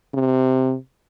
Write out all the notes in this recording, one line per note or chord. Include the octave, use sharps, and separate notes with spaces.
C3